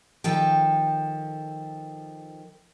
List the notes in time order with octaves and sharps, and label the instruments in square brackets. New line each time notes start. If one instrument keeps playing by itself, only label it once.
[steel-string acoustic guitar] D#3 F3 A4 G5